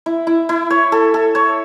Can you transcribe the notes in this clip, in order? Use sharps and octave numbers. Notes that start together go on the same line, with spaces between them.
E4
E4
E4
C#5
A4
A4
C#5